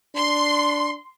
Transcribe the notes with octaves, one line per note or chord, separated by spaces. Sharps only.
D4 C6